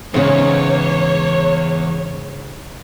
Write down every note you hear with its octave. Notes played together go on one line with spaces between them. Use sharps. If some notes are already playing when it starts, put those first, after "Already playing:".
E2 G#2 C#3 C#5